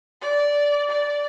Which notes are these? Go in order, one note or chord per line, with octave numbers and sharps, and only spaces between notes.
D5
D5